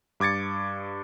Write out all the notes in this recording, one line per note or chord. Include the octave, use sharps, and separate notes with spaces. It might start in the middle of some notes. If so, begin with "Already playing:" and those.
G2 D6 G#6 A6 C#7